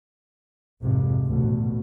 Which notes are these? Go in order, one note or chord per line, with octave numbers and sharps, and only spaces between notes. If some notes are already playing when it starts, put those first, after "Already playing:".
G#1 F2 C3
A1 D2 B2